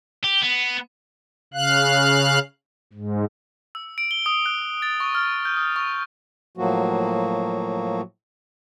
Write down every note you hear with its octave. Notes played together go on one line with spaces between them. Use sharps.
G4
B3
C#3 F5 F#6
G#2
E6
D7
G7
D#6
F#6
A6
C#6
F6
G6
D#6
C#6
A2 F3 F#3 A#3 F#4